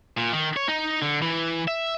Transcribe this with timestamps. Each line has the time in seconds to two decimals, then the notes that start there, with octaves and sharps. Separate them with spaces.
0.17 A#2
0.32 D#3
0.56 C#5
0.68 D#4
1.02 D3
1.22 E3
1.68 E5